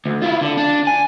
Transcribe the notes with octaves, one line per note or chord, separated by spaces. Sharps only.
D2
E4 F4
D3
D4
G#5